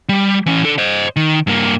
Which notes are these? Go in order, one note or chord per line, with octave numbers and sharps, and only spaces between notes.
G3
E3 C#4
D3 A4
C5 D#5
D#3
G2 A#3